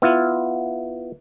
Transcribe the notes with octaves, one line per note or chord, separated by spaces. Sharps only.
B3 E4 F4